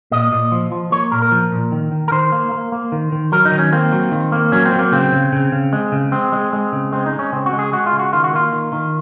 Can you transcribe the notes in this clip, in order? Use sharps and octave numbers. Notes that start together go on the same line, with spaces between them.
A#2 D#5
A#2
F3
F3
A#3 C#5
A#2 A#4
A#4
F3
A#2
D#3
D#3
A#4
D#3 C5
A#3
A#3
A#3
D#3
D#3
F#3 A#4
D#4
D#3
C#4
A#3 C4
F#3
D#3
A#3
F#3 C#4
C4
F#3
A#3
C#3 C4
C#3
C#3
C#3
G#3
C#3
G#3 C4
G#3
G#3
C#3
G#3 C4
D#4
G#3
C#4
C#3 C4
F#4
G#3
G#4
G#3 F#4
F4
C#3
F#4
D#3 F4
F#4
A#3 F4
D#3
D#3